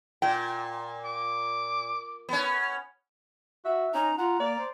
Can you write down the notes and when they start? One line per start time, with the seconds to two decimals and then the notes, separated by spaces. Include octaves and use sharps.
0.22 A#2 G5
1.05 D6
2.29 B3 C#4
3.65 F#4 E5
3.94 C#4 D#4 A#5
4.18 F4 F#5 A#5
4.40 A#3 D5
4.59 C5